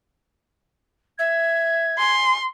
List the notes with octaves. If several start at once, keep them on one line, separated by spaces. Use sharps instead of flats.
E5 G#6
G#5 C6